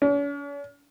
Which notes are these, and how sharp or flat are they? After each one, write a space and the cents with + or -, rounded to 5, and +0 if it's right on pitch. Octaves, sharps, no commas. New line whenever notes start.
C#4 +45